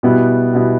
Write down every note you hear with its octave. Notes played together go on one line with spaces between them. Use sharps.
B2 G3 B3 E4
B2 G3 B3 E4